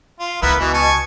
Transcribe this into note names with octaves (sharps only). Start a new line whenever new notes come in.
F4
C#2 B3 E4 A#4 B4
B2 E3
G#5 A5 C#6